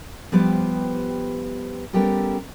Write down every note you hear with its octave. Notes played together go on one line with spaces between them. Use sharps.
F3 G3 B3 G4 B4 C5
G3 B3 C#4 G4 A4 A#4